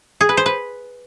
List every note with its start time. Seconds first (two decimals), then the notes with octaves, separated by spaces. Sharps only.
0.21 G#4
0.29 B4
0.37 C5
0.46 B4